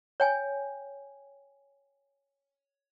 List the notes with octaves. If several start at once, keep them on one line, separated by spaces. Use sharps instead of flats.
C#5 G5 G#5